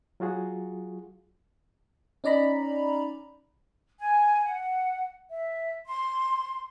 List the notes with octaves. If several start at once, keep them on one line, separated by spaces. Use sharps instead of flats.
F#3 F4 F#4 G#4
C#4 D#4 D5 A#5 B5
G#5
F#5
E5
C6